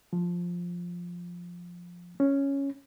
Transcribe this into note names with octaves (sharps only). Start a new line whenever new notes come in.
F3
C#4